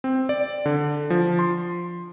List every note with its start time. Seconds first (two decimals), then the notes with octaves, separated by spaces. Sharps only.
0.04 C4
0.29 D5
0.66 D3
1.10 F3
1.39 C6